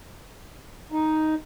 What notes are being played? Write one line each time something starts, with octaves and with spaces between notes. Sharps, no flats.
D#4